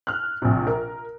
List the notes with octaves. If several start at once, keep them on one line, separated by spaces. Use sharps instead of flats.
F6 F#6
A#1 C3
A#4